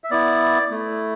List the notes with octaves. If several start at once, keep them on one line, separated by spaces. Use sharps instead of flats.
E5
B3 E4 D5
A3 E4